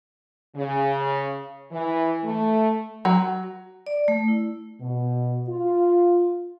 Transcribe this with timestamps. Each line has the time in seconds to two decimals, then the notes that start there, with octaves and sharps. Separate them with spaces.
0.56 C#3
1.72 E3
2.25 A3
3.05 F#3
3.87 D5
4.08 A3
4.28 E4
4.82 B2
5.50 F4